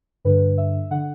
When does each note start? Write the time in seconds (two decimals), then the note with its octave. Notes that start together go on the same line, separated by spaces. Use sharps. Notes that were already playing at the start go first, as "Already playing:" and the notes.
0.25 G2 D3 B4
0.58 E5
0.91 D3 F#5